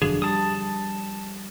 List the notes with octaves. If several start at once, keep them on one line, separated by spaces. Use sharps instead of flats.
E1 F#2 D3 F3 D4 F#4 G#4
G3 A5 D#6